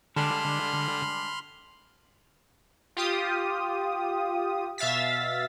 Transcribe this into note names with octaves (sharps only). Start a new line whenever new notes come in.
D3 G3 G#3 D4 B5 C6 F6
F4 G4 D#6
B2 E5 F5 A6 B6